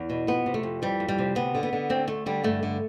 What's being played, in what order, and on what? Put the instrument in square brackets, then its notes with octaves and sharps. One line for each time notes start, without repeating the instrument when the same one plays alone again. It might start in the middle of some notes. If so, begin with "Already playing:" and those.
Already playing: [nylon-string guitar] E2
B2
F2 B3
C3
A3
F2
E3 G3
F2
G3
C3
D2 B3
D3
B3
D3
D2 C4
D2 A3
D3 G3
G2 A3
D3